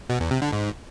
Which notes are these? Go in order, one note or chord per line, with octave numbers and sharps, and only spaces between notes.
B2
E2
C3
D3
G#2